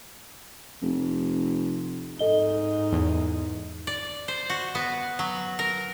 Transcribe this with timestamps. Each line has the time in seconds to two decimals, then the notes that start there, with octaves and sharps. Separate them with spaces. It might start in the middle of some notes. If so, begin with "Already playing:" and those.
0.82 F1
2.19 G#2 D#4 A4 D#5 G7
2.92 E2
3.87 D5
4.28 C5
4.50 F#4
4.75 B3
5.19 F#3
5.59 A#4